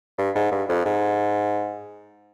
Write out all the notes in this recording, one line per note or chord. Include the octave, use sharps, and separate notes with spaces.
G2
G#2
G2
F2
G#2